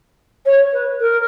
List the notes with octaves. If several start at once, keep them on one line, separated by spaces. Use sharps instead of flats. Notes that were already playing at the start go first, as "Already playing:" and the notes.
C#5
B4
A#4